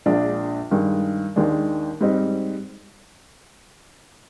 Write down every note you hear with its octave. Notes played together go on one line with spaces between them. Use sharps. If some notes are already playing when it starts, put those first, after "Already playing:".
A#1 A#2 G#3 D4
G2 D#3 G#3
D#2 D#3 G#3 D4
G#2 G3 C4 D#4